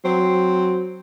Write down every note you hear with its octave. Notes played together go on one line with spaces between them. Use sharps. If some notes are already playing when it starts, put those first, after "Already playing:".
F#3 C4